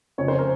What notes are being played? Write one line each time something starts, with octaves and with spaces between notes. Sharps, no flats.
F2 C#3 F3 C#5
C5
A#4